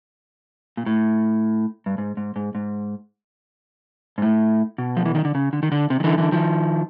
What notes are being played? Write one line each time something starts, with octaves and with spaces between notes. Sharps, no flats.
A#2
A2
G2
G#2
G#2
G#2
G#2
G#2
A2
B2
F3
E3
D#3
D3
C#3
D3
D#3
D3
C3
D#3
D3 E3
D3 E3
D#3 F3